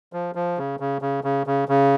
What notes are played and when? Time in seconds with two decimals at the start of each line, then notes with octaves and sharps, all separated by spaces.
0.13 F3
0.35 F3
0.58 C#3
0.80 C#3
1.02 C#3
1.24 C#3
1.47 C#3
1.68 C#3